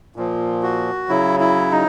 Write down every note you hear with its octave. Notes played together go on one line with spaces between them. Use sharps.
A#2 F3
F#4
C#3 F#3 E4
E4
D#4